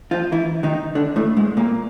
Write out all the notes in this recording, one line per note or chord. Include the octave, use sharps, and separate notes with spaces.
F3 F4
E3 E4
D#3 D#4
D3 D4
A2 A3
G#2 G#3
A#2 A#3